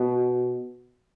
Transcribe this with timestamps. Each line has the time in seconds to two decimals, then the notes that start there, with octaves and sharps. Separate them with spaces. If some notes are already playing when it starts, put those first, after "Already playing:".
Already playing: B2